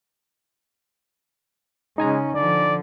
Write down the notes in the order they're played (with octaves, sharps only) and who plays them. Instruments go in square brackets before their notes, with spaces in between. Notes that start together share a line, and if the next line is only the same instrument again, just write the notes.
[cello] C#3 C#4 [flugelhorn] G#3 [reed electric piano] D#4 G#5 A#5
[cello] D3 F3 [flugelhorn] D5